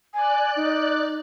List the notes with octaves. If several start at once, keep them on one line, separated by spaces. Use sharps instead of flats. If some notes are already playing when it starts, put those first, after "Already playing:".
D5 G#5 F#6
D#4